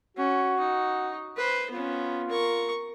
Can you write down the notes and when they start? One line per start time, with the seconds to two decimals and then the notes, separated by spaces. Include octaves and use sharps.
0.17 C#4 F#4
0.59 D#4
1.37 B4 C5
1.70 B3 C#4 F4
2.30 A#4 C#6